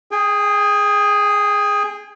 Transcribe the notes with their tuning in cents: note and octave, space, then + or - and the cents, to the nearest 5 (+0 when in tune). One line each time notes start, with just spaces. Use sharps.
G#4 +0 G5 +40